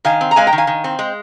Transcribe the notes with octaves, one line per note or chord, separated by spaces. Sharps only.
D#3 F5 G#5
C4
A#5
G#3 F5 G#5
G5 A#5
D#3
F5 G#5
D#3
C4
G#3